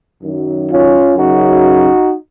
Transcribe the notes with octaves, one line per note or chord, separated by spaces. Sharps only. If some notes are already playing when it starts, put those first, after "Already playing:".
F#2 D#3 F#3
C#4 F4
F#2 C#3 F#3 D#4 F#4